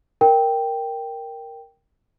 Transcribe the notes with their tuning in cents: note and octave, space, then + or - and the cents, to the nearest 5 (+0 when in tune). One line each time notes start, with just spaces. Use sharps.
A#4 +0 G5 +0